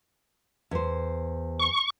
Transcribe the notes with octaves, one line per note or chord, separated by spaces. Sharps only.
E2 C5
C#6